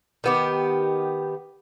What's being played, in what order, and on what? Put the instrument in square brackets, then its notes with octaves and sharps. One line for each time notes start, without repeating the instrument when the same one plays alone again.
[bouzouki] D#3 B3 G4